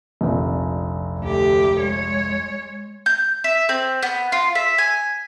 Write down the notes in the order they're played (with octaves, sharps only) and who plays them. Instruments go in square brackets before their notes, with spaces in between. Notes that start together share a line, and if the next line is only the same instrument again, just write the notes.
[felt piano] F1 A#1
[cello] D2 G4
G#3 C#5
[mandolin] G6
E5
C4
B3
F4
E5
G#5